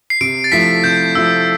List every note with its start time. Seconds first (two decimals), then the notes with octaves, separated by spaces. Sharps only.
0.10 C7
0.21 C3 D7
0.44 A6
0.52 F3 A3 E4 B6
0.84 C3 G6
1.15 F3 A3 E4 E6